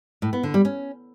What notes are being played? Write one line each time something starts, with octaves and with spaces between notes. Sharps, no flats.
A2
B3
D3
G3
C#4